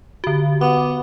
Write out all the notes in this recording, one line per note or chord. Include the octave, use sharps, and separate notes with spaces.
D3 F#4
B3 D6